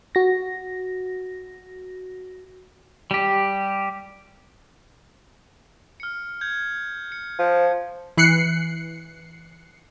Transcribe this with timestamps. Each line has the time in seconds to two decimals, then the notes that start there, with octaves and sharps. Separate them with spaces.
0.15 F#4 A#6
3.11 G3 G4
6.00 F6 C#7
6.41 G6 G#6
7.12 C#7
7.39 F3
8.17 E3 F#6 C7 C#7